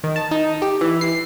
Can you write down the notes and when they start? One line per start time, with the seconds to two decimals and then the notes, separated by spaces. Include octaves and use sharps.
0.04 D#3
0.16 A5
0.31 D#4
0.62 G4
0.81 E3
1.01 C7